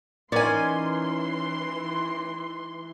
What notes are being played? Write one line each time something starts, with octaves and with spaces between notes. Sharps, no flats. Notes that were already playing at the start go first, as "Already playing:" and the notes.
E3 C#4 D#4 A#4 D5 G#5 C6